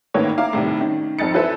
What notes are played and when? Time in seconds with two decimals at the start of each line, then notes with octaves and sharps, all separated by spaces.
0.14 A1 A2 D#3 A#3 B4 C#5
0.38 E4 F5 A#5 D6
0.53 A2 C3 D#3 G3
0.80 D#3 C#4
1.19 F1 F2 D#4 A6 C#7
1.34 E3 A4 B4 C5 E5